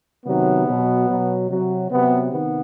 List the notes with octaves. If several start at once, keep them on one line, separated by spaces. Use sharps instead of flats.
C3 D#3 F#3 B3
B2 F#3
B2 F#3
C3 F#3
C3 F#3 B3
C3 D#3 B3